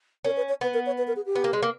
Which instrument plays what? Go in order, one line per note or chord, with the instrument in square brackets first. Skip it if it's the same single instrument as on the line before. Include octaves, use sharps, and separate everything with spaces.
[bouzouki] C#4 [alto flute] A#4
[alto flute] B4
C#5
[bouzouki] B3 [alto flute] B4
[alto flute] A#4
C#5
B4
A#4
G#4
G4
[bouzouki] B3
A#3
G#3
A#3